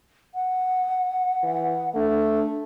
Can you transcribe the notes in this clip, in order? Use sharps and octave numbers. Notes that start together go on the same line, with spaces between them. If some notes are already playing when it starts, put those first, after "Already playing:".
F#5
E3
A3 D4